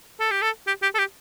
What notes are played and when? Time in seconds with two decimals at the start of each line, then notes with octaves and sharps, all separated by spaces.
0.20 A4
0.31 G4
0.42 A4
0.67 G4
0.82 G4
0.95 A4
0.99 G4